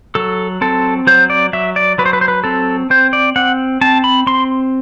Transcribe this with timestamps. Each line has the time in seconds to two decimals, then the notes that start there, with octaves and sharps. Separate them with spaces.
0.15 F#3 A4
0.61 C4 A4
1.07 F#3 C5
1.30 D5
1.53 F#3 E5
1.76 D5
1.98 F#3 B4
2.06 C5
2.13 B4
2.21 C5
2.28 B4
2.44 C4 A4
2.90 C4 C5
3.13 D5
3.36 C4 F#5
3.81 C4 A5
4.04 B5
4.27 C4 C6